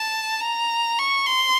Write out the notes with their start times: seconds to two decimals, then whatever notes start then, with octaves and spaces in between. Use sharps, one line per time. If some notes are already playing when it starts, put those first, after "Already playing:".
Already playing: A5
0.41 A#5
0.99 C#6
1.26 C6